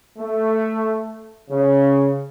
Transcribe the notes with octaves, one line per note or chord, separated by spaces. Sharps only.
A3
C#3